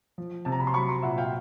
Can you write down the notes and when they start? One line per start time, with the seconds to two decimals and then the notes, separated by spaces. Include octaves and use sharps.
0.18 F3
0.45 C3 A5
0.52 A#5
0.60 B5
0.67 C6
0.74 F#3 B5 C#6
0.89 A#5 C6
1.03 A#2 E5 F#5
1.18 F5 G5